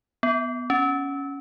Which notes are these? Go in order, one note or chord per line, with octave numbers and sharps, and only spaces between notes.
B3
C#4